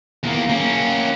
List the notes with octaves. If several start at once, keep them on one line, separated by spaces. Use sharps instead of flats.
E2 A#3
A#3 C#4